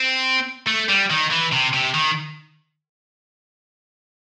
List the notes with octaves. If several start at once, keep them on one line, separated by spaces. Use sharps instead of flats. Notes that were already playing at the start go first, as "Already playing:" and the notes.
Already playing: C4
A3
G3
D#3
E3
C3
C3
D#3